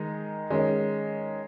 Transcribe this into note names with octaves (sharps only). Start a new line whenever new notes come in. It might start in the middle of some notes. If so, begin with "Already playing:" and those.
Already playing: D#3 G#3 D#4
D#3 G#3 C#4